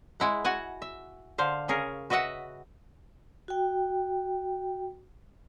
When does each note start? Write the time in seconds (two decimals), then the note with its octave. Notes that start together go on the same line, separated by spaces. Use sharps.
0.20 G#3 E4 F#5
0.45 F#4 F#5 G#5
0.82 E5
1.38 D3 C5 F5
1.68 C#3 C#4 G#4 A#4
2.10 F#4 B4 D#5 E5 F#5
3.48 F#4 G5